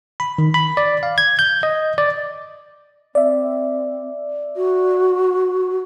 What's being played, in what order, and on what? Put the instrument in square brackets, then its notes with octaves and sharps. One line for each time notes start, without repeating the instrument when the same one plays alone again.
[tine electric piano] B5
D#3
B5
D5
F5
G#6
G6
D#5
D5
[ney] C4 [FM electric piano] D5 E5
[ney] F#4